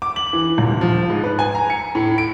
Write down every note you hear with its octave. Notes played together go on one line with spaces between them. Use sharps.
D6
F#7
E3
D#1
F3
G#2
B4
G#5
A#5
C#7
A2
D7